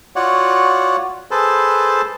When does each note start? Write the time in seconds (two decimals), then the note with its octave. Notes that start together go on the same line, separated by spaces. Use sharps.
0.16 F4 F#4 C#5 D5 F#5
1.31 G#4 A4 B4 C5 A5